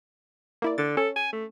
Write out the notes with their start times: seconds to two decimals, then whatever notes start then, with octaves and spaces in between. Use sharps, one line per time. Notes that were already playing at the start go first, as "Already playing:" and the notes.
0.62 A#3 E4 D5
0.78 D3 A6
0.97 C#4 A4
1.16 G#5
1.33 A3